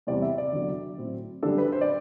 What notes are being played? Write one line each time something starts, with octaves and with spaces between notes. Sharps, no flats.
E2 C3 G3 D5
E5
D5
E2 D3 F#3
A2 F#3 C4 E4
F#2 D3 G3 D4 A4
B4
C5
D5